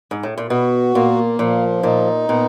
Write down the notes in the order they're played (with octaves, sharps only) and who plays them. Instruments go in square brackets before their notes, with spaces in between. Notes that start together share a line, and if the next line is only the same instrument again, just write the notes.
[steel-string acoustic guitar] G#2
A2
A#2
[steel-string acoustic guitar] B2 [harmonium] F#4
[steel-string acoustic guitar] A#2 [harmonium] A#3
[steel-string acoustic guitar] A#2 [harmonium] F3
[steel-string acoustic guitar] A#2 [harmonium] D#4
[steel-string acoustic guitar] A#2 [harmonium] B3